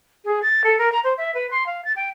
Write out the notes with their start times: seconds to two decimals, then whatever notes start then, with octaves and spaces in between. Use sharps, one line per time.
0.25 G#4
0.43 A6
0.64 A4
0.78 A#4
0.92 A#5
1.04 C5
1.18 E5
1.34 B4
1.51 C6
1.66 F5
1.85 A6
1.96 G5